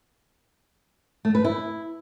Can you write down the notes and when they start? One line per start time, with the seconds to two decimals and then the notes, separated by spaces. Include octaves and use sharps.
1.25 A3
1.35 B4
1.45 E4